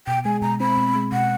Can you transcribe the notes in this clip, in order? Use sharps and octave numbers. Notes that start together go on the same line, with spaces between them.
B2 G5
G#3 G#5
B2 A#5
C4 B5
B2
G#3
B2 F#5